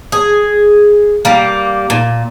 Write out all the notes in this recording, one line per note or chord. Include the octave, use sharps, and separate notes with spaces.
G#4
G3 A#3
A#2